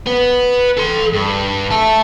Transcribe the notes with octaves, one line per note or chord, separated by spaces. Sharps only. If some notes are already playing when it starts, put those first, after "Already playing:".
B4 F#5
A4 C6
G2
E5 A5